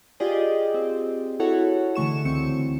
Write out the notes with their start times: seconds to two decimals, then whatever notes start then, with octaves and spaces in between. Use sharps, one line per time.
0.20 F4 G4 G#4 D5 D#5
0.74 C4
1.40 E4 F#4 A4 C#5 F#5
1.95 D3 E3 A3 C#6 E7
2.25 C#2 C4 C#7